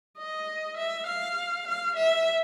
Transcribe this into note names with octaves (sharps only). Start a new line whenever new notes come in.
D#5
E5
F5
F5
E5